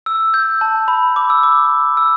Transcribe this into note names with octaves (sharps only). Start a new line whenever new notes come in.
E6
G6
A5
B5
D6
E6
D6
E6